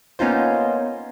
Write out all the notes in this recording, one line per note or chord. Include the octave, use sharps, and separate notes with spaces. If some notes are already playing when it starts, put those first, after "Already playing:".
A#3 B3 C#4 D#4 F4 C5